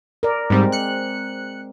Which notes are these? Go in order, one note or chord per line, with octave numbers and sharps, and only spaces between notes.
A#4 D5
G#2 G3 G#3 C4
F#6 C#7